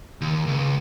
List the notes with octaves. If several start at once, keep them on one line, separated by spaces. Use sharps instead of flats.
D#2
C#2